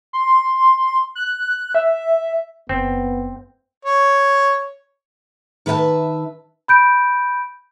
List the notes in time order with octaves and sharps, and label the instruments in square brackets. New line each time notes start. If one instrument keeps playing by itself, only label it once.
[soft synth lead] C6
F#6
E5
[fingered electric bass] F#1 [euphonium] B3 [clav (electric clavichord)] C4
[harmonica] C#5
[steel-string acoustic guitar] D#3 B4 E5 F#5 A5
[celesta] B5 G6 D7